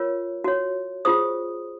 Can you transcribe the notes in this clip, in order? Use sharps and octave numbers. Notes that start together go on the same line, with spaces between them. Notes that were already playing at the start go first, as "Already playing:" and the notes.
Already playing: F4 A#4 C#5
F#4 C#5
F4 G#4 C5 D#6